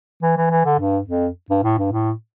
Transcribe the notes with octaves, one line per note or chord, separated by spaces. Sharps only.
E3
E3
E3
D3
G2
F2
G2
A2
G2
A2